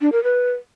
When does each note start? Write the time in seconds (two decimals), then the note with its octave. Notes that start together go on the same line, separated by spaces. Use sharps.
0.01 D4
0.12 A#4
0.24 B4